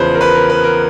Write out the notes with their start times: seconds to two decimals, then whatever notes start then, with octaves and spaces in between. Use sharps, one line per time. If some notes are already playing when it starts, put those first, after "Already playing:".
Already playing: E2 C#3 F3 B4 C5
0.14 A#4
0.21 B4
0.35 A#4
0.50 B4
0.64 A#4